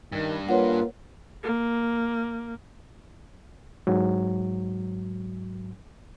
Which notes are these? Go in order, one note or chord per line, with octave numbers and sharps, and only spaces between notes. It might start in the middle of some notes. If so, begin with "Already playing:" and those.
G2 D#3
A#3 F4 B4 C#5 F#5
A#3
G#2 F#3